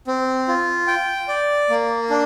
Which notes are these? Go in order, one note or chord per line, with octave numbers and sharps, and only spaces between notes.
C4
F4
G5
D5
A#3
D4